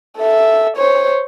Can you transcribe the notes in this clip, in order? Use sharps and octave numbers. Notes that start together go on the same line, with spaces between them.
A4 E5
C5 C#5